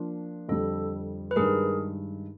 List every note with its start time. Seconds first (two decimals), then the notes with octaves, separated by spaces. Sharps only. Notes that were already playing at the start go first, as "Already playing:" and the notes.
Already playing: F3 A#3 D4 F4
0.48 F2 D3 G3 A4
1.31 B4
1.36 G2 D#3 G#3 G#4 A#4